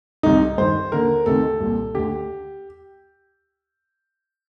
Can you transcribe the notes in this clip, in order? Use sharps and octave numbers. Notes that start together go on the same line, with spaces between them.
C2 C3 D#3 D#4
G2 D#3 C5
D#2 D3 A#4
D2 C3 D#3 A4
C2 A#2
D2 D3 G4